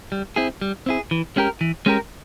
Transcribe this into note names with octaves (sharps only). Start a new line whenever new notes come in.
G3
C4 E4 G#4
G3
C4 E4 G#4
E3
G#3 C#4 G4 A#4
E3
G#3 C#4 G4 A#4